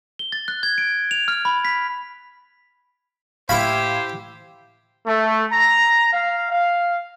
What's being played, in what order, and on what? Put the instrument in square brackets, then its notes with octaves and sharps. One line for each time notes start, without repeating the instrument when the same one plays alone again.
[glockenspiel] G7
A6
F#6
G#6
D7
F7
F6
B5
B6
[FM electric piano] A2 F5 G#6 [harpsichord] E4 B5 [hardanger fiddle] G4 [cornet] C5
[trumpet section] A3
A#5
F5
F5